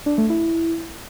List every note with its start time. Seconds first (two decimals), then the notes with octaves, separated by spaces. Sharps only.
0.06 D4
0.18 A3
0.30 E4